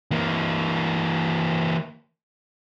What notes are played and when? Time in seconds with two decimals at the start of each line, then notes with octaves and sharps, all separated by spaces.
0.11 E3 A#3